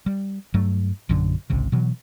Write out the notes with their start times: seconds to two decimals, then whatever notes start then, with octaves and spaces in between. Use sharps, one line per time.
0.06 G3
0.54 G2 F#3 A3
1.09 A#1 F#2 D3 F#3
1.50 G#1 C#2 C3
1.72 B2 E3 F#3